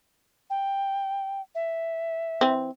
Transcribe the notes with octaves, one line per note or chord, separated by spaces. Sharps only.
G5
E5
E3 C4